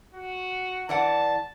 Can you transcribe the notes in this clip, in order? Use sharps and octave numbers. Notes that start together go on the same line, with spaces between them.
F#4
E3 D5 F#5 A5